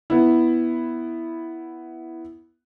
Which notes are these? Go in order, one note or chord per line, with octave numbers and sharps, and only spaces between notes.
B3 E4